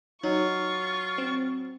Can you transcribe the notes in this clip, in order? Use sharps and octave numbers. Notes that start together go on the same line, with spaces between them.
F#3 D#4 F4 C#6
C4